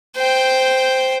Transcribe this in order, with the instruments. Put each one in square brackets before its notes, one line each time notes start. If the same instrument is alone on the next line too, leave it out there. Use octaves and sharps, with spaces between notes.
[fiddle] C5 G5